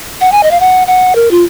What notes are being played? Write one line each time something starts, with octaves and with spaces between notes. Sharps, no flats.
F#5
G#5
D#5
F5
F#5
F#5
A#4
F4